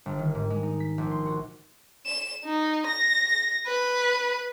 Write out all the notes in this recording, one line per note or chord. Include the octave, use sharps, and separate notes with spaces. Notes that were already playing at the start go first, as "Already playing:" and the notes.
G1
D#3
G#2
G#3
D#4
B6
A#1
C6
F#4
E7
D#4
A#6
B4